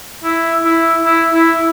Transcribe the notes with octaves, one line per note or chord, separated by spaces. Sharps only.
E4
E4
E4
E4